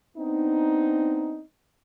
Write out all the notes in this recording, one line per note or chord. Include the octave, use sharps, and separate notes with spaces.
B3 C4 D4 D#4